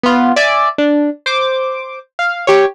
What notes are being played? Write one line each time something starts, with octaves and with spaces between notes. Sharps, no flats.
B3 F4
D5 E5 G#5
D4
C5 D6
F5
G4 C#5